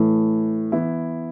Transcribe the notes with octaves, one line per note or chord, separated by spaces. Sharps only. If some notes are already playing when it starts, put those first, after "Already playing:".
Already playing: A2 E3 A3
E3 B3 E4